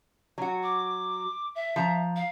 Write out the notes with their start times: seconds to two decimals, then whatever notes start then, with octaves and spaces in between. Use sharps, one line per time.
0.38 F#3 F#4
0.63 D6
1.55 E5
1.76 F3 A#5
2.16 F5